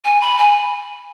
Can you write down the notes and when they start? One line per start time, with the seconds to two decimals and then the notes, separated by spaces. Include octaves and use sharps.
0.04 G#5
0.21 B5
0.38 G#5